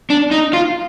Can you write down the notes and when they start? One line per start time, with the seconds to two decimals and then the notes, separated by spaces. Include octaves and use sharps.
0.10 D4
0.32 D#4
0.54 F4